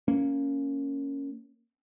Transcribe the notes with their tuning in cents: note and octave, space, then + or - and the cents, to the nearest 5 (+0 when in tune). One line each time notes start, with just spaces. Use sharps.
A#3 -10 C#4 +0